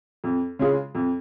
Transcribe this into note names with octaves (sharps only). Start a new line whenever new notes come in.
F2
C#3 G#3 F4 G#4
F2